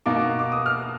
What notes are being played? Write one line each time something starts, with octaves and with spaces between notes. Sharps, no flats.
B2 A#3 D#4 D6
D6
D#6
F6